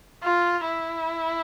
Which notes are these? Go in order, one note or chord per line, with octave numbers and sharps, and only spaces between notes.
F4
E4